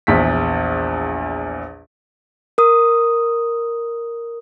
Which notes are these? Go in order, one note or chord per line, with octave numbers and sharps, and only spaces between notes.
A#1 E2 B6
A#4 D#6